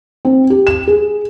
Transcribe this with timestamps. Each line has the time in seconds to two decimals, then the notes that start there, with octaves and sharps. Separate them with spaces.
0.25 C4
0.50 G4
0.67 E7
0.87 G#4